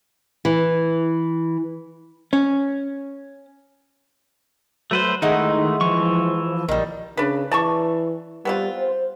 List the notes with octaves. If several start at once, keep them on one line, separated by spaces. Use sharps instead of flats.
E3
C#4
F#3 A3 B4 C5
D#3 G#3 A3 D#4 E4 F#5
E3 F3 C#6
A#1 D#3 G3
C#3 D4 B4
E3 D5 A5 C#6
G3 B3 C4 F4
C5